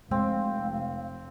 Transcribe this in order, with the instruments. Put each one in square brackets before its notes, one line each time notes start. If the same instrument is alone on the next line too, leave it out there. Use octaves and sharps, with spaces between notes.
[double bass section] F1 [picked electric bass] G#3 [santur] C4 [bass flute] F5